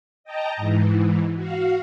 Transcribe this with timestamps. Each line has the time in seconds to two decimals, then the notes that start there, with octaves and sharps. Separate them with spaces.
0.24 D#5 G5 A5 A#5
0.57 G#2 E3
1.36 F#4 F5